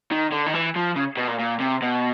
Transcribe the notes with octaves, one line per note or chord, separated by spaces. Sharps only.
D#3
D3
D#3
E3
F3
C#3
B2
A#2
A#2
C3
B2